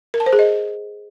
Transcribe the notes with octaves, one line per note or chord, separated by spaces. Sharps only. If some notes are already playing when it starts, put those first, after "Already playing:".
A#4
A5
C5
G#4
D#5